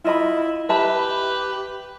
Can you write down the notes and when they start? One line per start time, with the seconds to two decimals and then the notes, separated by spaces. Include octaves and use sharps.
0.05 E4 F4 D#5 B5
0.69 G4 B4 E5 A5 B5